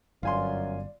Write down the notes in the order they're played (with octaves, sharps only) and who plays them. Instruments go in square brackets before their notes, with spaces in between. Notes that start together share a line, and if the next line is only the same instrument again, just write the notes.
[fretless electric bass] G1 [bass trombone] F#2 [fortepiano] F4 G#5 C6 [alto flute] D5